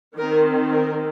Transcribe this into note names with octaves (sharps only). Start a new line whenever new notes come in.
D#3 C4 A#4
A#4